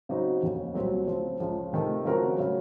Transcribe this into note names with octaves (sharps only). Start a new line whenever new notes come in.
C#3 F#3 C4 D#4 F#4
F1 D#2 C#3
C2 A#2 F#3 C4
C#3 F3 C4
C#2 C#3 F3
C3 D#3 A3
C#3 F3 C4 F#4 A#4
C#3 F#3